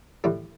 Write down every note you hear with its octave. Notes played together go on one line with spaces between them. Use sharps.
A2 E3 G3 G4